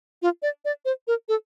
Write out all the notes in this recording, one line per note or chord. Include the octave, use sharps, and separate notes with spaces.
F4
D5
D5
C5
A#4
A4